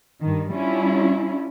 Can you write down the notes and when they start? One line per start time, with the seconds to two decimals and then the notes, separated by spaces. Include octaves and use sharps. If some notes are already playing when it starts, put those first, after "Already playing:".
0.21 G2 D#3
0.51 G3 C#4 D4 E4 F4